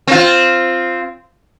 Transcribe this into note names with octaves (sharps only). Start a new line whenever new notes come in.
C4 F4